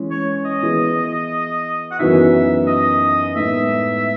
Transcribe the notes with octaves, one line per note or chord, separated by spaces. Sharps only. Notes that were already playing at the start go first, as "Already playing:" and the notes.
Already playing: E3 G#3 C#4
C#5
D#5
E3 B3 E4 G#4 B4
F#5
F#2 E3 B3 D#4 F#4 E5
D#5
A2 G#3 B3 D#4 E5